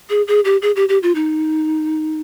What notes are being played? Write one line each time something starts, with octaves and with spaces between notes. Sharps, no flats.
G#4
G#4
G4
G#4
G4
G4
F4
D#4